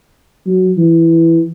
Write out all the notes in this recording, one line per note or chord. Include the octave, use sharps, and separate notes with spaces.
F#3
E3